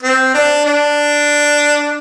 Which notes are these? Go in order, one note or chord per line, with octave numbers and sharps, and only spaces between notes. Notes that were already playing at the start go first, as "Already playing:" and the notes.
C4
D4
D4